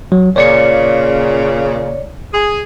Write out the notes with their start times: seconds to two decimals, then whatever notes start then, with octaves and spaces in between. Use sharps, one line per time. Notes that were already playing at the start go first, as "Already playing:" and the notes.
0.12 F#3
0.36 A#2 C#3 C#5 D5 C#7
2.32 G#4